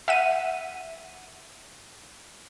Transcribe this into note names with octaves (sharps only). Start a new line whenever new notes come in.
E5 F#5 D#7